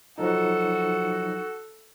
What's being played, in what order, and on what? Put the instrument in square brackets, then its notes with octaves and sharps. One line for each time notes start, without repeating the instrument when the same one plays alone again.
[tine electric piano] F3 F#3 D#4 [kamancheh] F#4 A4